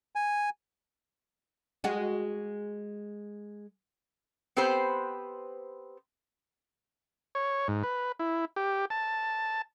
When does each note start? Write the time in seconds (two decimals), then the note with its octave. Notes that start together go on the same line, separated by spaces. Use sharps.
0.16 G#5
1.84 G#3 F#4 G#4
4.56 B3 C4 G4 B4 C5
7.35 C#5
7.68 G#2
7.83 B4
8.19 E4
8.56 G4
8.90 A5